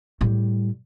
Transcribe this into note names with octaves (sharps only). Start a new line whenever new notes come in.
A2 G3